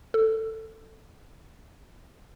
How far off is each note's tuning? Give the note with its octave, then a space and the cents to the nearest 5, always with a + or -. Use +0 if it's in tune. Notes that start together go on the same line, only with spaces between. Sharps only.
A4 +10